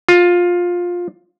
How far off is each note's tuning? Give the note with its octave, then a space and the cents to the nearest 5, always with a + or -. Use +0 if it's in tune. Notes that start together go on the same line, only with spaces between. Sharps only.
F4 +15